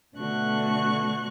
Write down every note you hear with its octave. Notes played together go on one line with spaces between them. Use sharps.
B2 D3 A3 F#4 C#6 F#6